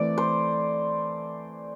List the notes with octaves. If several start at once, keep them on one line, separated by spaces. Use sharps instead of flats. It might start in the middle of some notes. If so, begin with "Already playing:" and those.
Already playing: E3 A3 C4 D5
C5